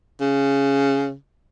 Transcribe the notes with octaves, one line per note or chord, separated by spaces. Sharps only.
C#3